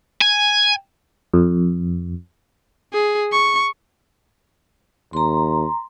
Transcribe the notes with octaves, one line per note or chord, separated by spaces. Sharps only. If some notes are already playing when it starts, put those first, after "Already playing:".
G#5
F2
G#4
C#6
D#2 A#5 C6